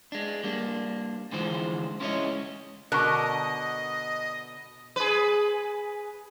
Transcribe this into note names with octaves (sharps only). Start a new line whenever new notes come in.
G#3 D4
G3 A#3 D4
G#2 D3 E3 F3 G#3 C5
G#3 C#4 E4 B4 C#5 D#5
B2 D3 A#4 D#5 C#6 F#6
G#4 B4